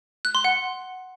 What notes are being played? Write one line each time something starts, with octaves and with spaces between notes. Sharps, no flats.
F#6
C6
F#5